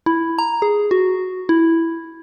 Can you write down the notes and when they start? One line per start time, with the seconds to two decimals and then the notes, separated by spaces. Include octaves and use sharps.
0.06 E4
0.38 A#5
0.62 G#4
0.91 F#4
1.49 E4